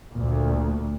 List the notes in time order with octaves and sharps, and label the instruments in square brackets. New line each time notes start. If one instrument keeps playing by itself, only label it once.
[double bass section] D2 A#2